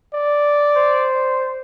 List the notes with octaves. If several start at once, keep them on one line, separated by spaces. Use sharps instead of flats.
D5
C5